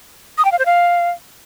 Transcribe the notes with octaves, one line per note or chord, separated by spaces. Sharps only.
D#6
G5
F5
C5
F5